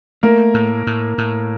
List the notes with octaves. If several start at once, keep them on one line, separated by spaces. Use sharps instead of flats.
A3 A#3 A#4
A2
A2
A2